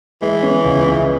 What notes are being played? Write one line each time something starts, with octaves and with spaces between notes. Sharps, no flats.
E3 G#3
C#4
C#2
C#3